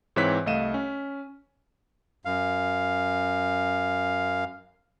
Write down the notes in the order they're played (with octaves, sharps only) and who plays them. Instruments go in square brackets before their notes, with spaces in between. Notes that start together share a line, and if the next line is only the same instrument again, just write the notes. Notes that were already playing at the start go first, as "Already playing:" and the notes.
[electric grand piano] G#2 E3 C4 C#5 F#6 B6
C2 A3 D#5 F5 D#7 E7
C#4
[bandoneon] F#2 F5